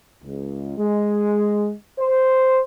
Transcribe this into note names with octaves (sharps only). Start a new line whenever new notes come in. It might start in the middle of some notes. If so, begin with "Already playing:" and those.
C#2
G#3
C5